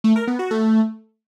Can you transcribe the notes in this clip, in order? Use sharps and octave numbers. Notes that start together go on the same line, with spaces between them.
A3
A#4
B3
F#4
A3